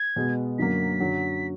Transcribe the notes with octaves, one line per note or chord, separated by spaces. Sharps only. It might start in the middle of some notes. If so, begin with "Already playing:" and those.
Already playing: G#6
B2 G#3 B3
F#2 D3 F#3 A#3 B6
F#2 D3 F#3